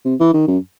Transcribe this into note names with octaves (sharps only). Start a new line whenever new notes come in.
C3
E3
D#3
F#2